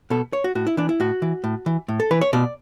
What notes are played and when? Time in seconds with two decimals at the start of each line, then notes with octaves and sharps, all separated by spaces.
0.10 B2 A4
0.33 C#5
0.44 F#4
0.55 A2 F#4
0.67 E4
0.77 E3 D4
0.89 E4
1.00 A2 F#4
1.22 E3
1.44 A2
1.66 E3
1.88 A2
2.00 A4
2.11 E3 B4
2.21 C#5
2.33 B2 D5